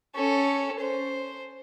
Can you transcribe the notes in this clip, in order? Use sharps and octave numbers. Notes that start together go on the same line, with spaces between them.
C#4 A4
C5